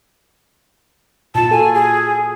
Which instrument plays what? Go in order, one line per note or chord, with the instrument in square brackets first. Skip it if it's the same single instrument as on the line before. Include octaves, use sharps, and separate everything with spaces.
[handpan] A#2 F4 [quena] A5
[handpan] F#4 A4 [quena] G#5
[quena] G#4